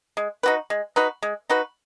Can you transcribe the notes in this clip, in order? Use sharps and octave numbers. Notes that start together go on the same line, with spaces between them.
G#3
D#4 F#4 B4
G#3
D#4 F#4 B4
G#3
D#4 F#4 B4